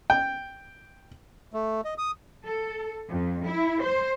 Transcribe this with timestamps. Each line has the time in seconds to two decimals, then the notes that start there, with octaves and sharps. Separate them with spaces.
0.10 G5
1.53 A3
1.85 D#5
1.98 D#6
2.44 A4
3.08 F2
3.45 E4
3.80 C5